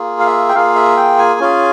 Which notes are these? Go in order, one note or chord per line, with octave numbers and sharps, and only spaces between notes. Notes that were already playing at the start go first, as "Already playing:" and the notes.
Already playing: A#3 F4 G#4
F5
E5
G5
A#3 F4 G#4 F5
E5
G5
G#5
C#4 F4 G#4